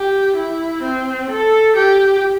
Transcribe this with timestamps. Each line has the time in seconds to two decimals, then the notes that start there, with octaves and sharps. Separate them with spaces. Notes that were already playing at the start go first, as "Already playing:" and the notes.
Already playing: G4
0.37 E4
0.83 C4
1.30 A4
1.76 G4